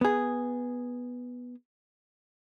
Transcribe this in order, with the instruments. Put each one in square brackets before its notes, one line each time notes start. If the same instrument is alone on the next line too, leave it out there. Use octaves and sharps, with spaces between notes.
[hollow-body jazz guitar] B3 G#4